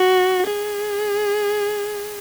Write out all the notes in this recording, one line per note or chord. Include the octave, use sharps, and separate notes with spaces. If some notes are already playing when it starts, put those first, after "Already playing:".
Already playing: F#4
G#4